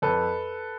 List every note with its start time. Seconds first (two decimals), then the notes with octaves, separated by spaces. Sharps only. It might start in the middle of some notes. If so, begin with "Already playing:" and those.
0.02 F2 A4 B4